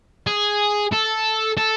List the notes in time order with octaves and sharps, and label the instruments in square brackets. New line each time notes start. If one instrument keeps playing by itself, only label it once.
[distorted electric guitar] G#4
A4
A4